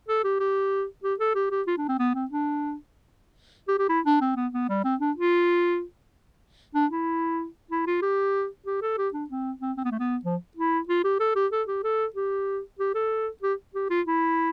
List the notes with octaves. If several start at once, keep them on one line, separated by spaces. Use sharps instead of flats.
A4
G4
G4
G4
A4
G4
G4
F4
D4
C4
B3
C4
D4
G4
G4
E4
D4
C4
B3
B3
G3
C4
D4
F4
D4
E4
E4
F4
G4
G4
A4
G4
D4
C4
C4
C4
B3
A3
B3
F3
E4
F4
G4
A4
G4
A4
G4
A4
G4
G4
A4
G4
G4
F4
E4